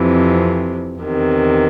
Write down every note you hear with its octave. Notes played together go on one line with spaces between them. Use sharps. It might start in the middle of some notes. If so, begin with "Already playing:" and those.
Already playing: F2 C3 E3
E2 C3 D#3